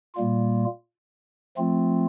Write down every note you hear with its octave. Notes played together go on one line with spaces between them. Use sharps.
A#2 G3 A#3 F4
F3 A3 C4 F4